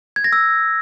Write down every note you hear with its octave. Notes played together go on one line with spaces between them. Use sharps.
G#6
A#6
E6